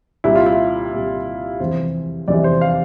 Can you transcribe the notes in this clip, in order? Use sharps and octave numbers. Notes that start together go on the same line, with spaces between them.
C2 A#2 G3 E4
F4
E4
C2 A#2 G3
F1 E2 C3 E3 G3 C5
F1 E2 C3 E3 G3 D5
C5
F5